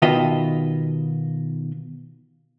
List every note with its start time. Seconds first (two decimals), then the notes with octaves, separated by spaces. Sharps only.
0.02 B2 D#3 F4 B4 D#5 E5